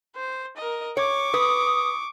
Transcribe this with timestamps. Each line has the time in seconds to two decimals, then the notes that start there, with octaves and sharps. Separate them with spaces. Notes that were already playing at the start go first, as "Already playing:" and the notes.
0.16 C5
0.57 A#4 D#5
0.97 C#5 C#6 D6
1.34 B4 D#6